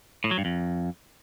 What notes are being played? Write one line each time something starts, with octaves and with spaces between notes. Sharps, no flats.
A2
F#3
G2
F2